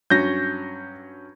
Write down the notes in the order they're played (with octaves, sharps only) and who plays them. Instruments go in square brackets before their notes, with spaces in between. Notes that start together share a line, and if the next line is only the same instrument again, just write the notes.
[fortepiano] G2 F#3 C#4 [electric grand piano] G6 A#6